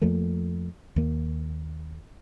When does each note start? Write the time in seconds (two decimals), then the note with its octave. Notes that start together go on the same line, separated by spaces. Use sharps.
0.02 F2 F3 A3 A#3
0.96 D#2 A#3